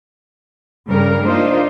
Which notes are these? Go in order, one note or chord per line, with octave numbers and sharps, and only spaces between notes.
G2 C#3 G3 A#4
A#3 D4 D#4 F4 C5